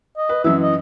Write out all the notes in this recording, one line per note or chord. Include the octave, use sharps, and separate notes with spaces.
D#5
B4
F#2 E3 E5
D#5